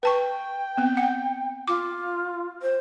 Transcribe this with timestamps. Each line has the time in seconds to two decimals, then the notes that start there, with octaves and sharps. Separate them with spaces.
0.03 B4 G5 A5 C#6
0.77 B3 C4
0.97 F#5
1.68 F4 D6
2.62 C5